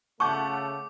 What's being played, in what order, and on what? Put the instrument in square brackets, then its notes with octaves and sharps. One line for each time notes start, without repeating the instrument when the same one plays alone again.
[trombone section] C#3 A3 [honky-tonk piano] F#5 A5 G6 [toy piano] C#6 [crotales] D6